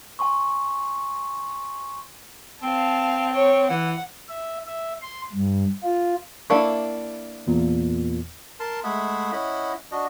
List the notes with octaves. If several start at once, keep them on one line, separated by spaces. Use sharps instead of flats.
G#5 C6 C#6
C4 F5 A5
C#5
E3 F#5
E5
E5
C6
G2
F4
A#3 D4 E4 E5 A5 C#6
E2 A#2
A#4 A5 C6
G#3 A3 G#4 E5 F#5 B5
C#4 E4 D#5 F#5 B5
D4 F#4 D#5